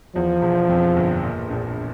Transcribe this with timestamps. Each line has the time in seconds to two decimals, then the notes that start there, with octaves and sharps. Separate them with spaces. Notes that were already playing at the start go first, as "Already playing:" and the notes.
0.15 E2 F3
0.42 E1
0.69 F2
0.96 G1
1.23 A#2
1.50 A#1